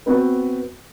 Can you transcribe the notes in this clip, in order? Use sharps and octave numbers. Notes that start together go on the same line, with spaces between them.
B3 C4 F#4 B4